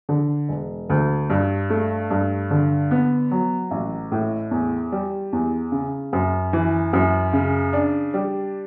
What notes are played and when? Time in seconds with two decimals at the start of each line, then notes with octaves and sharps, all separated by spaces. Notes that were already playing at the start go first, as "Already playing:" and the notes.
0.09 D3
0.49 E1
0.90 D2
1.30 G2
1.70 A3
2.10 G2
2.51 D3
2.91 B3
3.31 F#3
3.71 A1
4.12 A2
4.51 E2
4.92 G3
5.33 E2
5.72 C#3
6.13 F#2
6.53 E3
6.93 F#2
7.33 C#3
7.73 D4
8.14 G3